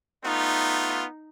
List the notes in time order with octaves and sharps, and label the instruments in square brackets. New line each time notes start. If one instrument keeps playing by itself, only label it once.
[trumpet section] A3 B3 F4 [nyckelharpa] D#4